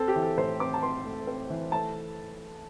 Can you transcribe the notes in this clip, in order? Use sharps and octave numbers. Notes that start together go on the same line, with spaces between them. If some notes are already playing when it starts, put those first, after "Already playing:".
Already playing: C4 A4
G4
E3
A4
A2 C5
C4 D6
A5
C4 C6
A3
C4
E3
A3 A5